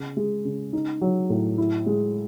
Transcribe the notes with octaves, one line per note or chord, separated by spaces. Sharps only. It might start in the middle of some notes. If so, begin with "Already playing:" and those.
Already playing: C#3
G#3
C#3
D#4
F#3
A2
E4
G#3